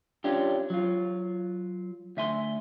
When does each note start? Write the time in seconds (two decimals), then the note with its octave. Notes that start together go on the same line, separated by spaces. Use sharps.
0.24 C#4 D4 F4 G4
0.70 F#3 F4
2.17 D2 E5 G#5 C6